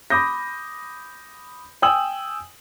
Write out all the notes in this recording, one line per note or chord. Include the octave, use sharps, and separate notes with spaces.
B5 D6 D#6 G6 A#6
G5 G#5 D#6 E6 F#7